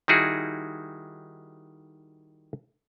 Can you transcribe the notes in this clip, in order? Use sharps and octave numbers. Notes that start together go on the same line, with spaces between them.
D#3 G3 D#4 E4 F#4 G#4